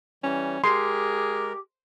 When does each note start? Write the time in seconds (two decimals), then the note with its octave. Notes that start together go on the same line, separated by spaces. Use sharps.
0.23 E3 G3 C#4
0.64 G#3 G4 G#4 A#4 C6